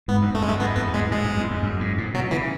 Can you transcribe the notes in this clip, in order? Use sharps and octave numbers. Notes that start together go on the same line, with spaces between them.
G#2 B3
F#2
F#2 A3
E2 G#3
F#2 A3
G#2 B3
E2 B3
G#2 G#3
A2 G#3
F#2
E2
F#2
F#2
G#2
A2
B2 F#3
C#3 E3